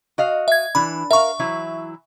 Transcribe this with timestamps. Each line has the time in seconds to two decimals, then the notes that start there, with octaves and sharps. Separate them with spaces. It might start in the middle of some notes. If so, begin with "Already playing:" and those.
0.18 F#4 D#5 F5
0.48 E5 G#6
0.75 E3 D4 B5
1.11 A#4 E5 F5 C#6
1.39 E3 F#3 E4